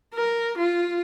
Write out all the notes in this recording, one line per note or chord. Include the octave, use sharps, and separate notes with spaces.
A#4
F4